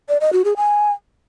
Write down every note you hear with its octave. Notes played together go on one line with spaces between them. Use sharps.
D5
D#5
F#4
G#4
G#5